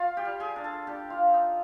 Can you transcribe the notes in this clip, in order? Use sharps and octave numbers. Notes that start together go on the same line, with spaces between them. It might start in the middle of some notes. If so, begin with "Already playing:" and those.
Already playing: F4 F5
G4 G5
G3
G#4 G#5
D4
A4 A5
D4 G4 G5
F4 F5
D4
D#4 D#5